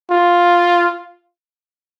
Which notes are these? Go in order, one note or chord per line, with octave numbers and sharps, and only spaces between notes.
F4